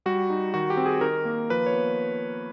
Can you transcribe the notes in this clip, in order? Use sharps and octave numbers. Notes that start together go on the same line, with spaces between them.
G3 F#4
D#4
D#3 F#4
G4
C4
G#4
D#3 A#4
A#3
F3 B4
C#5
B3